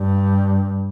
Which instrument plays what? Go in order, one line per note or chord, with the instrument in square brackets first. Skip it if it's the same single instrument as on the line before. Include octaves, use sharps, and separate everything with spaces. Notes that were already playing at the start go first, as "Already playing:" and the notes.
Already playing: [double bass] G2